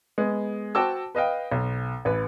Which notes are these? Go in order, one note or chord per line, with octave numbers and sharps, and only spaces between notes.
G#3 B3
F#4 C5 G5 A5 D6 E6
B4 D#5 F5 G5
B1
A1 B4